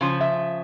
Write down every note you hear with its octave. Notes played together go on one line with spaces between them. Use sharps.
C#3 F3
E5